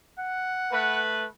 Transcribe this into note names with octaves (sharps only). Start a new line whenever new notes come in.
F#5
A3 B4